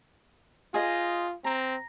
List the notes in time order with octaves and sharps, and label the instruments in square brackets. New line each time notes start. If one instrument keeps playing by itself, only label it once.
[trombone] F4 [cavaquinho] G#4 C5 D#5
[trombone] C4 [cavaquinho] A#5